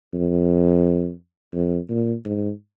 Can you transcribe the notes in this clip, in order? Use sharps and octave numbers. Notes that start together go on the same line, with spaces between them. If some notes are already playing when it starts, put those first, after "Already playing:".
F2
F2
A#2
G#2